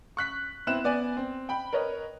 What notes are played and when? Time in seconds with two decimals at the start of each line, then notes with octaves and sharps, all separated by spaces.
0.17 C#6 F#6 B6
0.67 B3 C4 E4 F#6 E7
0.84 B3 D5 G#5
1.17 C4
1.49 G5 B5
1.73 A#4 B4 C#5 D#5